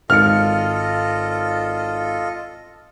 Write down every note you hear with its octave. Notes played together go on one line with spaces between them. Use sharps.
G#1 F4 A4 D#5 F5 F6 C#7